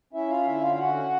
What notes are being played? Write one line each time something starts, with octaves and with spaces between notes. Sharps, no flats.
C#4 E4 E5
F4 F5
D3 E4 E5
F4 F5
F5
C#4 F#4 F#5